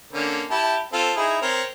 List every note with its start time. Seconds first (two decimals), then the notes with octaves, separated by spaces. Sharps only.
0.13 D3 A#3 C#4
0.50 E4 G4 A5
0.93 C4 F4 A4
1.16 D#4 E4 G#4
1.42 C4 A#4 C#5